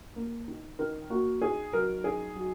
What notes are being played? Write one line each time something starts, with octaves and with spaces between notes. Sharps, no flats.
A#3
D#3
D#3 A#4
A#3 F#4
D#3 G#4
F#3 A#4
D#3 G#4
F#3